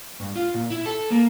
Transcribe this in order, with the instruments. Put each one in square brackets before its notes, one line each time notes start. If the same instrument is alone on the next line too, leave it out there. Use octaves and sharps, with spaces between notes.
[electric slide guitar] G2
F4
A#2
E4
A4
A#3